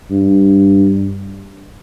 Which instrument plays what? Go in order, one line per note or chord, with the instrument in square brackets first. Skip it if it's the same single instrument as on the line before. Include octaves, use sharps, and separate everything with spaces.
[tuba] G2